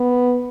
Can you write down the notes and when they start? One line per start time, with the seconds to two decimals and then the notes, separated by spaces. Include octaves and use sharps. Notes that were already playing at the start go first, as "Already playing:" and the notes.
Already playing: B3